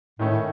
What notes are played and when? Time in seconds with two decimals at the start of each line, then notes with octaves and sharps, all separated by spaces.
0.19 A2 D#3 A3 C#4